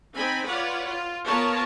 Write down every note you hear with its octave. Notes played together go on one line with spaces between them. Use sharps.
C4 D#4 G#5 B5
F4 B4 C#5 D5 F#5
F4
B3 F4 A#4 C#5 A5